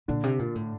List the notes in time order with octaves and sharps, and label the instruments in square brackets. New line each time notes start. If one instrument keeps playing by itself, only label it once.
[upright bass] A#2 [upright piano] D3 D4
[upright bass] C3
A#2
A2